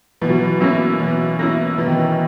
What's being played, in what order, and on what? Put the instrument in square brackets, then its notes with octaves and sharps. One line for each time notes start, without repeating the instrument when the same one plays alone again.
[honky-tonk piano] B2 [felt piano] E3
[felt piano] F#3
E3
[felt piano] F#3 [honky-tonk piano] A#3 C#4 E4
[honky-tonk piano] B2 [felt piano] E3
[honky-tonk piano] A#3 C#4 E4
[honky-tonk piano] B2 [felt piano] E3
[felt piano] D#3
E3